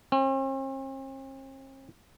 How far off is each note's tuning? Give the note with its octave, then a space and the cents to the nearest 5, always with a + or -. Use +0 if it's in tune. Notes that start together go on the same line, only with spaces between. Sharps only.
C4 +45